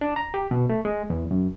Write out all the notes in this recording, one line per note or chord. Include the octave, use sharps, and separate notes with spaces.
D4
A#5
G4
B2
A3
G#3
E2
F#2